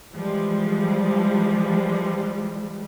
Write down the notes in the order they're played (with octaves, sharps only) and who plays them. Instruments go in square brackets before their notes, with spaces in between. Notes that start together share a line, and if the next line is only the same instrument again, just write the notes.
[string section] E3 F3 G3 G#3